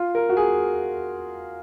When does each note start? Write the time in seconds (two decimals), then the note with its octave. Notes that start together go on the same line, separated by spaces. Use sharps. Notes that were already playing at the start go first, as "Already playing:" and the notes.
Already playing: F4
0.15 A#4
0.29 F#4
0.37 G#4